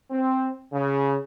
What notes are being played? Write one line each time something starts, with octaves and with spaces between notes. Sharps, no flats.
C4
C#3